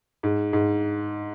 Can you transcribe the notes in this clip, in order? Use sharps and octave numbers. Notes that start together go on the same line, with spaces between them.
G#2
G#2